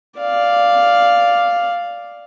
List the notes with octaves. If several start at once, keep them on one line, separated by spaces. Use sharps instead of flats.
D5 F5